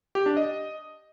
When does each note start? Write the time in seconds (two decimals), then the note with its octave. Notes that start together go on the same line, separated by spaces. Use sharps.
0.15 G4
0.26 D4
0.37 D#5